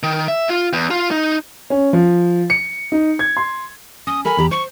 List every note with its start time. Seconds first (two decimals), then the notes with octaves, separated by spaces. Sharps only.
0.03 D#3
0.28 E5
0.49 F4
0.73 E2
0.91 F4
1.11 D#4
1.70 C#4
1.93 F3
2.50 C#7
2.92 D#4
3.19 G#6
3.37 C6
4.07 C#4 D#6
4.25 A4 A#4 G#5 B5
4.37 E2 G4 A#5
4.51 C5 C#6